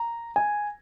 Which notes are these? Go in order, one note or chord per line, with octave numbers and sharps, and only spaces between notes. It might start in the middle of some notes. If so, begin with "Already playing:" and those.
Already playing: A#5
G#5